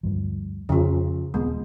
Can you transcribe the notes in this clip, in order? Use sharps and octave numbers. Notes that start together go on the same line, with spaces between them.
D2 G2 F3
F2 C#3 F3
D#1 G#3 B3 C4